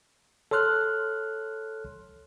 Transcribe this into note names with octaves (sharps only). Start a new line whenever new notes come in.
A4 C#5 C6 F6 F#6